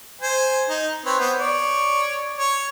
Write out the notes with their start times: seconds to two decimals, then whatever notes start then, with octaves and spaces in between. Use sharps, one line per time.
0.21 C5 G#5
0.69 D#4
1.05 C4 B4 C#5
1.20 B3 C5
1.37 C#5 D5
2.38 C#5